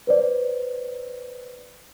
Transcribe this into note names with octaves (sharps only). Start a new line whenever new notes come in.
B4 C5 D5